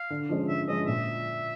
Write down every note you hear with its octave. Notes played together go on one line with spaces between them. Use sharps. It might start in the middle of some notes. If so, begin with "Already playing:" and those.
Already playing: F5
D3
F3 G#3 C#4
D3 E5
F3 G#3 C#4 D#5
A#2 E5